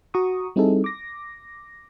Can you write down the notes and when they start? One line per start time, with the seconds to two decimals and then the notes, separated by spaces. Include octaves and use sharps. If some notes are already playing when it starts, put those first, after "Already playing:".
0.14 F#4 A#5 C#6 D#6
0.56 G3 C4 D#4 E4 G#4 A4
0.84 D6 A#6